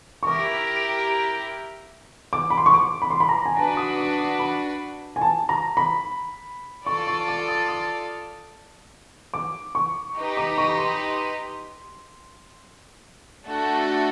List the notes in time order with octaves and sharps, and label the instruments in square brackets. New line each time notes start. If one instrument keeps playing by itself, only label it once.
[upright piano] C#6
[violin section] E4 G4 A#4 [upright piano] D6
[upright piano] D6
B5
C6
C#6
D6
B5
C6
B5
A#5
G#5
[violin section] D4 F#4 B4 [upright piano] A5
[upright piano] D#6
D6
D6
B5
G#5
A5
A#5
B5
[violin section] F4 A4 D5 [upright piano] C#6
[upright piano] C#6
D6
D#6
D#6
D6
C#6
[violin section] D#4 G4 B4 D#5
[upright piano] D6
C#6
B5
C6
[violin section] A3 D4 F#4 A4